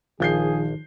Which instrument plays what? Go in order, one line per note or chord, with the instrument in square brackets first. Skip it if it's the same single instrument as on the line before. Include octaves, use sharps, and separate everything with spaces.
[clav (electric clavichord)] A#1 [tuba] D#3 [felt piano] F3 G6 C7 [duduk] G#4